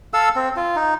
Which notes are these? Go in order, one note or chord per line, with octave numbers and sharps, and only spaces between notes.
A4 F5 E6
C4
F4
D#4